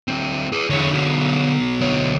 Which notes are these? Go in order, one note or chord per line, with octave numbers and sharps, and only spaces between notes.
D2 C4
G#4 B4
E2 D3 G#4 C#5
B1 B2
D2 C#5